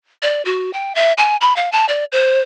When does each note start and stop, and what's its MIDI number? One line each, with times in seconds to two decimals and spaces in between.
0.22 0.42 74
0.45 0.73 66
0.73 0.93 79
0.95 1.13 76
1.18 1.37 80
1.41 1.55 83
1.56 1.69 77
1.72 1.86 81
1.89 2.05 74
2.12 2.41 72